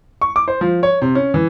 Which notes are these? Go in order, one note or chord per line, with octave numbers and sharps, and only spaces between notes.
C#6
D6
C5
F3
C#5
C3
C#4
E3